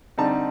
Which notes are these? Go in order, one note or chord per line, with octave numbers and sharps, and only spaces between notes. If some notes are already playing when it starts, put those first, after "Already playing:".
D3 G3 C4 D#4 A5